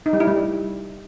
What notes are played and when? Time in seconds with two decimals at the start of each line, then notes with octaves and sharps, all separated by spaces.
0.06 D#4
0.13 G3
0.20 E4
0.28 G3